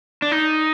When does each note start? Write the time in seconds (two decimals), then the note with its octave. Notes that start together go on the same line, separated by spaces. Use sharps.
0.22 D4
0.32 D#4